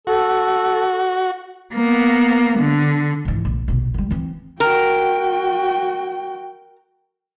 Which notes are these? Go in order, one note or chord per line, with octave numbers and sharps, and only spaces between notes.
F#4 A4
A#3 B3
D3
G#2 E3
A#1
A#1 B2
D3 G3
E3 C4
F#4 A#4 G5